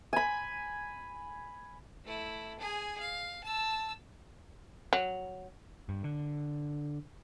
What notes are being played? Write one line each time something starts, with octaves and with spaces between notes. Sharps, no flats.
G#5 B5
A3 E4
G#4 G#5
F5
A5 E6
F#3
G2
D3